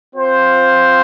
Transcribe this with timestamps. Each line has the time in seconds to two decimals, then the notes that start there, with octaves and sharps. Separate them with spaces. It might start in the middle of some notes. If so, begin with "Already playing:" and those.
0.14 C4 F4 C5